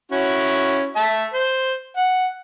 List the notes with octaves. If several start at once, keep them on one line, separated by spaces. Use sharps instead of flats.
C#4 E4 F#4
E5 A5
C5
F#5